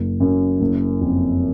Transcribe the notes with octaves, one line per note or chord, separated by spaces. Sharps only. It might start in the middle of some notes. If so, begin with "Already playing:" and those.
Already playing: F#1
F#2
F#1
F2